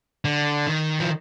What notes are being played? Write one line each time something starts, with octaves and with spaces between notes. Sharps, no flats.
D3
D#3
F3